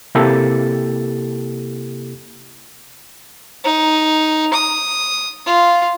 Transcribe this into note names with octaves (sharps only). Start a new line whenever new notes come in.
C3 A#3 E4 G4 A4 A6
D#4
D#6
F4